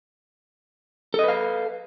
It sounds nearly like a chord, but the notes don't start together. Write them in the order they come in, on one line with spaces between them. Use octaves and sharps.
A4 D#5 B4 F5